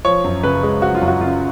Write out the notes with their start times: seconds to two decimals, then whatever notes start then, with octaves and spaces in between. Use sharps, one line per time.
0.05 F3 C#5
0.24 F#2
0.43 C#3 B4
0.63 G#3
0.82 F3 F#4
0.95 F4
1.01 F#2
1.08 F#4
1.21 C#3 F4